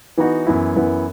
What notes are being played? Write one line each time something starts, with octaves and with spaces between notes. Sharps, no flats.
E3 B3 D#4 F#4
F#2 E3 B3 E4
F#2 E3 B3 E4